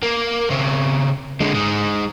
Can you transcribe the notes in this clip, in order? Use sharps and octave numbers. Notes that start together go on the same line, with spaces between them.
A#3
C#3 C4
D3 G#3
G#3 D#4